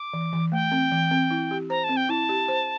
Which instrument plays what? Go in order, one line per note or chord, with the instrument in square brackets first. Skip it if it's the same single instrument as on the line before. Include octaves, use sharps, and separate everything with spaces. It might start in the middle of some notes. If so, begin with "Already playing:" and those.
Already playing: [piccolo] D6
[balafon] E3
E3
[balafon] A3 [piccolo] G5
[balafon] C4
E3
C4
E4
G4
[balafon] C5 [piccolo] A#5
[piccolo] A5
[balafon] C4
[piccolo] G5
[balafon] E4 [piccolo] A5
[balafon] G4
C5